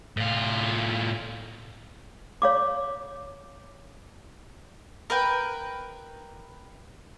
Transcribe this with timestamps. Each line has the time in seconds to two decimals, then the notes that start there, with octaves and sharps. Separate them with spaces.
0.17 A2 F4
2.42 C#5 F5 D6
5.10 A#4 B4 G5